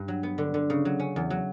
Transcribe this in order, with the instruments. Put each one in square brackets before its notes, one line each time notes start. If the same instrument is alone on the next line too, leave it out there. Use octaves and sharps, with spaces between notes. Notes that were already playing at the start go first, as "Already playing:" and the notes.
Already playing: [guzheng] G2
F#3
B3
D3
D3
C#3
F#3
C#4
E2
F#3